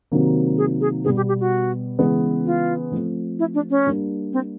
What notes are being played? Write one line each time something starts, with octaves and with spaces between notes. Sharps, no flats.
C3 D#3 F#3 A#3
G#4
G#4
B2 G3 B3 G#4
G4
G4
F#4
C#3 E3 G#3 B3
F4
F3 A3 C4
E4
D4
C#4
G3 A#3 D4
C4